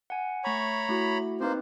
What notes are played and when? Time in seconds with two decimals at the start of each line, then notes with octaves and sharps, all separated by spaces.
0.10 F#5 G#5
0.44 A3 C#5 A#5 B5 C#6
0.89 A3 E4 F#4
1.41 A#3 C4 D#4 B4 C5